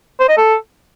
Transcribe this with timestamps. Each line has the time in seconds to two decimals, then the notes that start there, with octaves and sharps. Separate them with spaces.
0.20 C5
0.29 D#5
0.38 A4